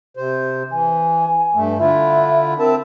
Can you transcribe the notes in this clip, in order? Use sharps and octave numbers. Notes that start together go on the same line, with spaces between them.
C3 C5
E3 G#5
G2 A3
D3 E4 F4 E5
C4 A#4 E5 A5